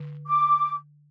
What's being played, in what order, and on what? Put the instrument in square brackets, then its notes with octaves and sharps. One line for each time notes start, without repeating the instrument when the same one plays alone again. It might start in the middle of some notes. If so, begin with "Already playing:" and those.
Already playing: [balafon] D3
[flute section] D6